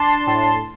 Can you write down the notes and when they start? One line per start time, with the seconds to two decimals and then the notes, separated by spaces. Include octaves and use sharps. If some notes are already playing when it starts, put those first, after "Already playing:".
Already playing: D4 A5 C6
0.27 A2